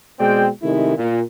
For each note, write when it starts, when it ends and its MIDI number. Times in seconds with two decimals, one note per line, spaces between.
0.19 0.46 47
0.19 0.46 56
0.19 0.46 60
0.19 0.46 74
0.19 0.46 79
0.62 0.96 48
0.62 0.96 51
0.62 0.96 56
0.62 0.96 57
0.62 0.96 63
0.62 0.96 64
0.96 1.20 46